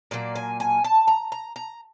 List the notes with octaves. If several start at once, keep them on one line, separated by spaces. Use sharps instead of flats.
A#2 F#3 A#3 D5
G#5
G#5
A5
A#5
A#5
A#5